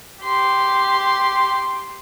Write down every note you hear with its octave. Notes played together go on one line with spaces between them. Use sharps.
G4 C6